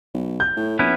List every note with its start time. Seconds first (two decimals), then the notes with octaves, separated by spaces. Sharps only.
0.14 B1
0.40 G6
0.56 A2
0.79 A#1 B3 C#4 E4